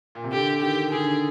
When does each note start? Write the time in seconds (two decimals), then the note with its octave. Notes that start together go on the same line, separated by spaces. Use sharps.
0.15 A#2
0.24 C3
0.32 D3 G4
0.62 D#3 G4
0.92 D3 G#4